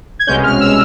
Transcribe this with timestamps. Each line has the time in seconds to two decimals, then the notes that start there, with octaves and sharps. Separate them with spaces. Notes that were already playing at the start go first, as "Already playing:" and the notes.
0.19 G#6
0.27 C2 B2 G#3 C#4 G6
0.43 F6
0.61 E6